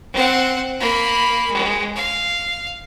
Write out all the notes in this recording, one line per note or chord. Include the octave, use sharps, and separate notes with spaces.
C4 F#5
A#3 B5
G#3
F5